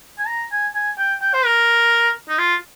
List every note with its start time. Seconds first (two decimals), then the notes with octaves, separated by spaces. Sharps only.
0.18 G#5
0.27 A#5
0.51 G#5
0.74 G#5
0.98 G5
1.21 G5
1.34 C5
1.45 A#4
2.29 D#4
2.38 F4